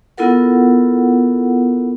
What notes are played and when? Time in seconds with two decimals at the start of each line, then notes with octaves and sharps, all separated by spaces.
0.18 B3 E4 F4 A4 A#4 F#5